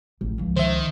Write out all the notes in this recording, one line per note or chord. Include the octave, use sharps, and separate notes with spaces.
A1
C#2 F3
D#3 C5 E5